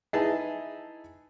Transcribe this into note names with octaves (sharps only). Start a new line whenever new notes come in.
D#4 E4 G#4 B4 A5